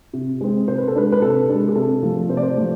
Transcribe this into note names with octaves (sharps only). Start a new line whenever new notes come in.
C3
G#3 C4
C3 C5
B4
A4
G#3 D4 B4
B4
C3 A4
G#3 D4
G#4
C3 A4
F3 A3
C3 C5
D5
C5
F3 A3